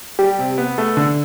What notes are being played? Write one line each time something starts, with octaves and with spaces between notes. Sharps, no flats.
G3 G4
C3
B3
A3
D3